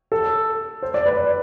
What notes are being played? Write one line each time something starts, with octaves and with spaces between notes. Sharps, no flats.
A4
C5
D5
B4
D5